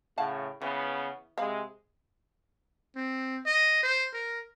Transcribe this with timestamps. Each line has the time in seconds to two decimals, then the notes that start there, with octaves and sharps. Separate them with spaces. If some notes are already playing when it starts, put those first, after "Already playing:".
0.18 A2 C#3 F5 F#5 A5
0.62 C#3 E3 B3
1.38 C3 G#3 C5 F5 B5
2.96 C4
3.46 D#5
3.83 C5
4.14 A#4